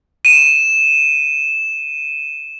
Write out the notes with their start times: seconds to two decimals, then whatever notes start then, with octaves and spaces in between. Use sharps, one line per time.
0.25 D#7 E7